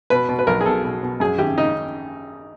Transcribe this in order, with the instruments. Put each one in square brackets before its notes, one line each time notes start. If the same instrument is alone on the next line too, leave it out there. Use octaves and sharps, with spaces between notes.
[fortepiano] B2 B4
B2
B4
B1 A#4
G#4
B2 A4
B2
B2
F#2 G#4
G#1 G4
C#3 D#4